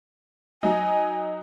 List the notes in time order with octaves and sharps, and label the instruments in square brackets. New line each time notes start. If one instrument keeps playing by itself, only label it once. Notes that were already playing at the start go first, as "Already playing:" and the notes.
[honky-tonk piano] F#3 D#4 [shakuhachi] G#5